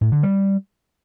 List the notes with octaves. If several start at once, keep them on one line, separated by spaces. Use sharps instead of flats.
A2
D3
G3